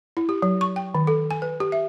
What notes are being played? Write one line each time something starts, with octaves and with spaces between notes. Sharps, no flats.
E4
G4
F#3
C#6
G5
D#3
A4
G#5
B4
G4
E5